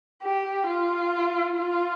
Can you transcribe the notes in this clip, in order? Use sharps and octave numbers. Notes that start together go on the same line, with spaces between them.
G4
F4
F4